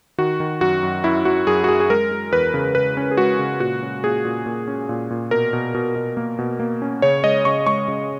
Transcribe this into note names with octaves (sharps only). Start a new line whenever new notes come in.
D#3 F#4
D#3
F#2 F#4
F#2
F#2 E4
F#2 F#4
F#2 G#4
F#4
F#2 G#4
G#4
G#3 A#4
G#3
E2 B4
C#3
C#3 B4
C#4
G#4
G#3 F#4
C#3
A#2 F#4
C#4
A#2 G#4
A#2
A#2
C#4
A#2
A#2
B2 A#4
B2
B2
B2
A#3
B2
A#3
C#4
C#3 C#5
G#3 D#5
C#3 C#6
G#3 C#6
C#3